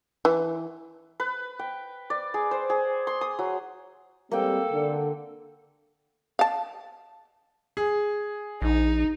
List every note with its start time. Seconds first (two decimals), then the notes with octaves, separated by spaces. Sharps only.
0.25 E3
1.20 B4
1.59 G5
2.10 D5
2.34 G#4
2.51 C5
2.70 G#4
3.07 C6
3.21 D#6
3.39 F#3
4.32 G3 G#3 A#3 C4 A4 G5
4.72 D3
6.39 F5 A5
7.77 G#4
8.62 A#1 D#4